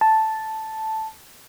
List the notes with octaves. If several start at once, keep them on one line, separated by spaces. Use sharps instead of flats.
A5